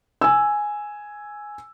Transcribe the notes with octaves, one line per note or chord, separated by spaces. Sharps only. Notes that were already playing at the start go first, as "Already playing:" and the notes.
G#5 E6